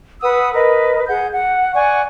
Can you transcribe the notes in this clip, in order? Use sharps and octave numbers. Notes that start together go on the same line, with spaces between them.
B4 F#5 D#6 E6
A#4 B4 D#5
G#4 F#5 G6
F#5
D5 F#5 G#5 C#6